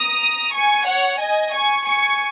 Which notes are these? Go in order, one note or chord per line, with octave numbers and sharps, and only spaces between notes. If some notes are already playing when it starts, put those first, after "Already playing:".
Already playing: A#5 D#6
G#5 C#6
C#5 F#5
D#5 G#5
G#5 C#6
G#5 C#6